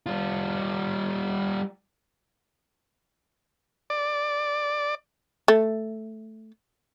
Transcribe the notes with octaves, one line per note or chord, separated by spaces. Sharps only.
G3 F4
D5
A3